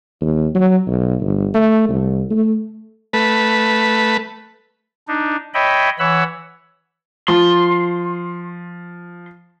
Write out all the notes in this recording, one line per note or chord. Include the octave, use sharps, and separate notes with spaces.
D#2
F#3
B1
G1
A3
C2
A3
A3 B4
D4 D#4
C#5 D#5 E5 G5 B5
E3 C#5 F#5 B5 E6
F3 C6